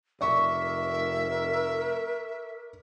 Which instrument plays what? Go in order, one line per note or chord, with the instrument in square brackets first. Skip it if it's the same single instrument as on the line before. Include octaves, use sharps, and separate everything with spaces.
[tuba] F1 [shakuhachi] A#4 [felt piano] D5 C#6 [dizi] E5